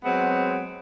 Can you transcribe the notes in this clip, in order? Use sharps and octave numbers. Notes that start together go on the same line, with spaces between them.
F#3 G#3 B3 C4